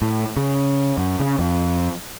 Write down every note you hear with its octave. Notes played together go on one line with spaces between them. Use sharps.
A2
C#3
F#2
C#3
F2